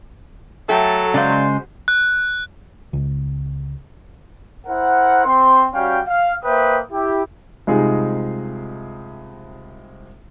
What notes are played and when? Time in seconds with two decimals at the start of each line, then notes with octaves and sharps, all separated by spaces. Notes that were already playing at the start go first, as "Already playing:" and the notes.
0.69 F#3 A3 A4 G5
1.14 C#3 G#3 C5 D5 F5
1.88 F#6
2.93 C#2
4.67 E4 A#4 C5 F#5
5.25 C4 C6
5.74 G3 C#4 F#4 F5 G5
6.08 F5
6.44 A#3 B4 C5 E5 G5 D#6
6.92 E4 G4
7.67 C2 C3 G#3 D#4 F4 G#4